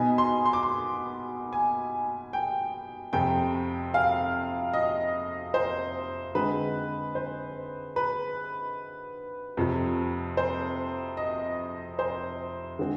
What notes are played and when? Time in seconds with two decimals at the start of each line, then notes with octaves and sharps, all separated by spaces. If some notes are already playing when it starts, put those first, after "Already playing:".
Already playing: B2 B3 D#4 G#5
0.18 C6
0.45 C6
0.53 D6
0.63 C6
1.53 G#5
2.33 G5
3.13 F2 C3 F3 G5
3.94 F5
4.73 D#5
5.54 C5
6.35 D3 G#3 C4 D#4 B4
7.15 C5
7.96 B4
9.57 F2 C3 F3
10.37 C5
11.17 D#5
11.99 C5
12.79 D3 G#3 C4